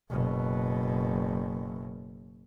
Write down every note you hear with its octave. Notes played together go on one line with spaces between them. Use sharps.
F#1 B2